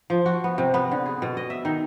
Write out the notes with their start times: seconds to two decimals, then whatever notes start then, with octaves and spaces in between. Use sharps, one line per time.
0.10 F3
0.26 F#4
0.44 B3
0.58 C3
0.74 B3
0.91 D3
1.06 G#4
1.22 B2
1.37 D#5
1.50 E5
1.65 D#3